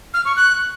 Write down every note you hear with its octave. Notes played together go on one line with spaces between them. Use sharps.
F6
C#6
F#6